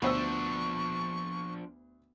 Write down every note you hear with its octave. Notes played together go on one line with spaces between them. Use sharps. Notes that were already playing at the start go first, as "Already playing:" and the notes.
D2 F3 B3 D4 C5 C#6 E6